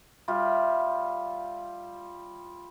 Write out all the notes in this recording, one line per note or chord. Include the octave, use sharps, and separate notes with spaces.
G3 F4 E5